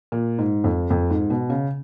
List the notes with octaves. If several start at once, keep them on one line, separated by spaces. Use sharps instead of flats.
A#2
G#2
F2
F2
G#2
B2
C#3